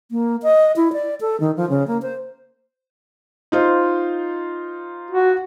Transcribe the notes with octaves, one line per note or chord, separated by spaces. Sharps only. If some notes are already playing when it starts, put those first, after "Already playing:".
A#3
D#5
E4
D5
A4
D#3
F3
C#3
A#3
C5
D#4 F4 C5
F#4